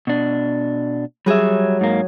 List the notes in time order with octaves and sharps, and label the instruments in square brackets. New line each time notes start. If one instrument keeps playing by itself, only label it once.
[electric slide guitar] B2 D4
[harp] F#3 G#4 [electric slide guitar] G3 E5
[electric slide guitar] G#2 A#3